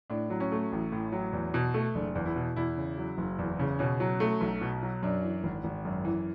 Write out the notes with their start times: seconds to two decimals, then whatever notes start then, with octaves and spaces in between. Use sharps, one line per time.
0.10 A2 D4
0.30 F#3
0.40 C#4
0.52 A3
0.72 A1
0.92 A2
1.12 F#3
1.33 E2
1.54 B2
1.74 A3
1.95 F#1 D4
2.15 E2
2.25 E4
2.36 B2
2.56 E2 E4
2.77 C#3
2.98 F#3
3.18 F#1
3.39 E2
3.59 C#3
3.79 B2 C#4
4.00 F#3
4.20 A3
4.41 B1
4.61 B2
4.82 F#3
5.03 F#2 D4
5.23 E3
5.44 G#1
5.64 G#1
5.85 F#2
6.05 E3